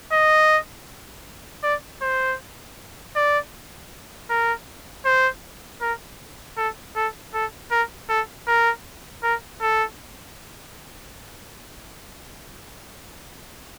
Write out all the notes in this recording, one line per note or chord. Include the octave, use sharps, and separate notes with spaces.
D#5
D5
C5
D5
A#4
C5
A#4
A4
A4
A4
A#4
A4
A#4
A#4
A4